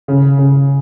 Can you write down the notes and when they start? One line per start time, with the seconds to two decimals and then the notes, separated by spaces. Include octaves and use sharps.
0.08 C#3
0.39 C#3